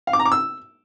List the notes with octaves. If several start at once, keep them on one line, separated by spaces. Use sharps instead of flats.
F5
D6
A#5
D6
E6